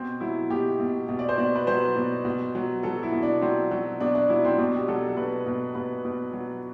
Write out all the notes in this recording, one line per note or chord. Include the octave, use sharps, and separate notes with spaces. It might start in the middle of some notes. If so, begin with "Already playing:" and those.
Already playing: B2 C4
F#3 E4
B2 G4
B2
B2
D5
C5
B2 D5
B4
F#3 C5
B2
B2
F#3
F#3 A4
E4
B2
D4
F#3 C4
F#3
B2 D4
D4
F#3 E4
C4
B2 D4
G4
F#3 A4
A4
B2 B4
B2
B2 B4
B2
F#3